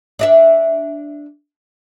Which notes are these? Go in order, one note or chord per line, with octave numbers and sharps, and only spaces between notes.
D4 D#5 E5